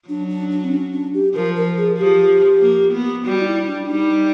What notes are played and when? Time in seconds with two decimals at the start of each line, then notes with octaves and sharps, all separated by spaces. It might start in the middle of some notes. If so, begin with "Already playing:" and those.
0.08 F#3 D4
0.29 D4
0.51 D4
0.64 C4
0.72 C#4
0.93 D4
1.14 G4
1.35 F3 A#4
1.56 A#4
1.77 G#4
1.98 F3 G4
2.62 A#3
2.93 B3
3.25 G3 F#4
3.42 D#4
3.46 E4
3.67 D4
3.88 G3 D#4